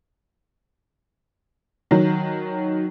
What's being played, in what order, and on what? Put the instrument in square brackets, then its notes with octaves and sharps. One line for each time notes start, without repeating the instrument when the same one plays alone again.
[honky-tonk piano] D#3 F#3